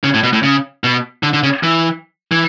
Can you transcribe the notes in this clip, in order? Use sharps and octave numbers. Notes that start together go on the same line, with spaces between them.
C#3
A2
B2
A2
C#3
B2
D3
D3
C#3
E3
E3